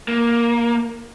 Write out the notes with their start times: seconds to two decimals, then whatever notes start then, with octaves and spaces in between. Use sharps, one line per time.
0.08 A#3